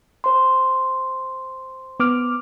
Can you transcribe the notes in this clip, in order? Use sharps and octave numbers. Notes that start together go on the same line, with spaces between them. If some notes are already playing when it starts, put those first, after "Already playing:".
C5 C6
B3 D6 F6